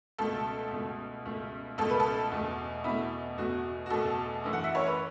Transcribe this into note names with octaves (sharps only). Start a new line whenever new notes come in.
C#2 B2 A3 A4
C#2 B2 A3
C#2 B2 A3
C#2 B2 A3 A4
B4
A4
E2 B2 A3
E2 B2 A3 E4
E2 B2 A3 F#4
F#4
E2 B2 A3 A4
F#2 E3 A3
F#5
E5
C#5
B4